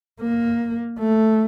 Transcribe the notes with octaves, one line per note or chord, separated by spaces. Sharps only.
A#3
A3